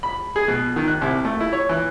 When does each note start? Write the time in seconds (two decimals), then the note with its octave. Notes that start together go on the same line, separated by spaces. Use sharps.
0.03 B5
0.36 G#4
0.48 B2
0.76 D#3
0.88 F#6
1.01 C2
1.25 A3
1.40 E4
1.53 C#5
1.69 E3